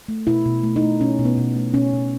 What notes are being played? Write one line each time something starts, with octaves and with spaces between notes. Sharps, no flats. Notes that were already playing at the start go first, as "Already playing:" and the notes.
A3
B2 E4
B2
A3
D#4
A3
B2 C#4
B2
B3
B2
A3
B2 C#4
B2